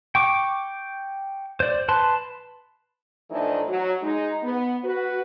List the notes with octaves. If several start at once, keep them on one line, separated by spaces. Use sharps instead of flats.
G5 C#6 D6
C5 D5
B4 A5 C6
A2 E3 F3 A3 D4 D#4
F#3
G#3 D#4
B3
F#4 B4